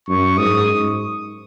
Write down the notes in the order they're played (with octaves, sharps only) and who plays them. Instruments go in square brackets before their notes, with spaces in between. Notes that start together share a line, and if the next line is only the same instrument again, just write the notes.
[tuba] F#2 [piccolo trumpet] C#6
[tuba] G#2 [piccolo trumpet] D#6